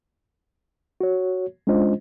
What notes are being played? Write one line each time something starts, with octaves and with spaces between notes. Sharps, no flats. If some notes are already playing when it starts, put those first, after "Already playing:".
F#4 C#5
G#3 C#4 D4 F4 C5 D#5